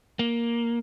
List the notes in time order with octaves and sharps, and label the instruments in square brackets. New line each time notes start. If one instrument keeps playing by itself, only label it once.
[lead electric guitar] A#3